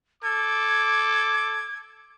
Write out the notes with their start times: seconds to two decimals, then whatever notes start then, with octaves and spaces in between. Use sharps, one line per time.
0.23 A4 D6 G#6